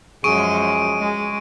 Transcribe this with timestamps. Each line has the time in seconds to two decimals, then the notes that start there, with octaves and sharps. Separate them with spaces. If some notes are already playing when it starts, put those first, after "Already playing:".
0.24 F#2 F3 G#3 G#4 C#6 D7 D#7
0.99 G#3